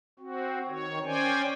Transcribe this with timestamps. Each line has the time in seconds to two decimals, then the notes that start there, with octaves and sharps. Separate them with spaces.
0.19 C4 F#4
0.68 D#3 C#5
1.05 C#4 C5 D5 G5 G#5